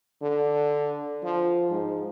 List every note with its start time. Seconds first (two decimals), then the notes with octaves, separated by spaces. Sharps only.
0.22 D3
1.23 F3
1.71 G#2